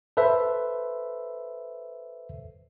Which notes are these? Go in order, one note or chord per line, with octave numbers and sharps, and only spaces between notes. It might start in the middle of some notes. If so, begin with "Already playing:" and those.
A4 B4 C5 E5